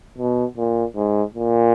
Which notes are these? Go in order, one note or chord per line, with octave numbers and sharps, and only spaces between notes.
B2
A#2
G#2
A#2